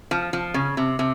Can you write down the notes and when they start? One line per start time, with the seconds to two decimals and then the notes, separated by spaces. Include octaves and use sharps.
0.11 F3
0.33 F3
0.54 C#3
0.77 C3
0.99 C3